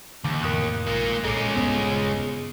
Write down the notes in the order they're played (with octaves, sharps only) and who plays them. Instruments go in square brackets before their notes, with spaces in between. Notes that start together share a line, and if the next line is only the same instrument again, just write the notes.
[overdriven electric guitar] D#2 [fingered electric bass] D3 E3
[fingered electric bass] F2 A2 C3 [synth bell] A#4 D#6 F#6
[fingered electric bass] A#1 G#2 [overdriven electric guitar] A#3 F4
[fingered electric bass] B1 A#2 [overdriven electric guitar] G#3 C#4 [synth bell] A4 D6
[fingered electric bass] D#1 G2 C#3 [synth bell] B3 D#6